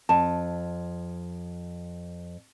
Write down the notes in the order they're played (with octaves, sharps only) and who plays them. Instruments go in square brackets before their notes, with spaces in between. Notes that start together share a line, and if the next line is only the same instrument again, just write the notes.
[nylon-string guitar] F2 [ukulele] A5